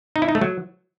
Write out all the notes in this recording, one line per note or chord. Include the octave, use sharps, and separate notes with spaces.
D#4
E4
D#4
A3
F#3